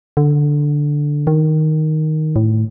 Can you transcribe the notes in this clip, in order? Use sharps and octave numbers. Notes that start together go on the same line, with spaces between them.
D3
D#3
A2